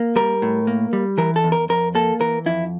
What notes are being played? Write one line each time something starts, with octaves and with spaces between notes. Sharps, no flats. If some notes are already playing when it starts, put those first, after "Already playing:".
Already playing: A#3
G3 A#4
A2
A#3
G3
E3 A#4
A4
E2
A#4
F2 A#4
A#3 A4
E3 A#4
F2 E4